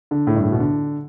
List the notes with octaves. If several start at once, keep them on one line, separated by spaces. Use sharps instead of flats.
D3
A2
G2
A2
B2
D3